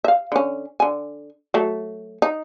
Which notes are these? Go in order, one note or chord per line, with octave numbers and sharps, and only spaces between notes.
E5 F5
D3 C#4
D3 G#5
F#3 A3
D#4